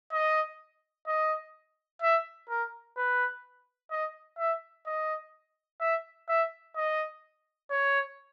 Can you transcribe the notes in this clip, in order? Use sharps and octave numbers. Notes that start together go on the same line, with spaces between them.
D#5
D#5
E5
A#4
B4
D#5
E5
D#5
E5
E5
D#5
C#5